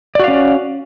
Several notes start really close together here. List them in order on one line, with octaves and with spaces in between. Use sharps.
D5 F#4 F5 C#4